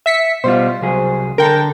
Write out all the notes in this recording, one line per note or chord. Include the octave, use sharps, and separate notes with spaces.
E5 B6 C#7
B2 G3 F4 C5
C2 F#3 G#4
D3 A4 A#4 G5